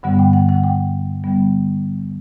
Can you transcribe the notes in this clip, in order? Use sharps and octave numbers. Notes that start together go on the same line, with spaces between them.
G2 D3 G3 B3 F#5
G5
F#5
F#5
G5
D3 G3 B3